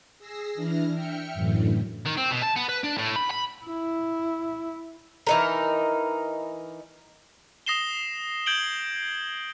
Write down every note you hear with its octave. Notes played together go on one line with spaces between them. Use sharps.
G#4 E6 A#6 C7
E3 D4 E4 F6 A#6
E5 G5 F6 C#7
F#2 A2 D3 E3
D#3
C4
B2
A5
B3
B4
D4
A2
B5
B5
E4
E3 D#4 A#4
D#6 A#6 C7 E7 G7
G6 G#6 D7 F#7 G7